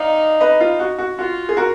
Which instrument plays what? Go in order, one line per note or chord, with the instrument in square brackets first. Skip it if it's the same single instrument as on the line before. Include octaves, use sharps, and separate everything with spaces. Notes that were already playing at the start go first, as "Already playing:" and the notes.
Already playing: [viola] D#4 [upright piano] D5 F5
[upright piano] B4 D#5
F4
F#4
F#4
[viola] F4 [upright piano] F#4
[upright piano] G#4
F#4 A#4